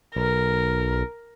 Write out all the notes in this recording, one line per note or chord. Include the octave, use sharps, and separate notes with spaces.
B1 A#4